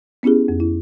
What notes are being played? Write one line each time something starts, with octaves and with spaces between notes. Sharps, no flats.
B3 C#4 E4 G4 G#4
F2
E4